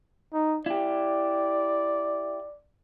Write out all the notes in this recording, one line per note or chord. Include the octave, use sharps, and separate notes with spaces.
D#4
E4 G4 D5